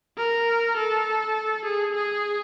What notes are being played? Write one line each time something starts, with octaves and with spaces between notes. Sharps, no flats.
A#4
A4
G#4
G#4